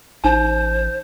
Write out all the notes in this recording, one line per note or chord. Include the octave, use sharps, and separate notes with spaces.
A1 D#4 C5 A5